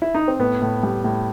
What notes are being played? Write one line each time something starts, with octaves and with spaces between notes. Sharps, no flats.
E4
D#4
C4
A2 B3
A2
G3
A2